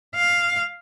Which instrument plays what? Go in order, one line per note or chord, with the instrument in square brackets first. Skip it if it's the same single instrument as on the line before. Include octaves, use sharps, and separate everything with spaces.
[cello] F5